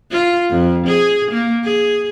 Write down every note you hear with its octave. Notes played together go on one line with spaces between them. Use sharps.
F4
F2
G#4
A#3
G#4